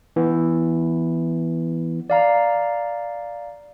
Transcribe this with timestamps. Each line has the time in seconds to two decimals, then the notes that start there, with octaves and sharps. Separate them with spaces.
0.16 E3 B3
2.10 D5 F5 A#5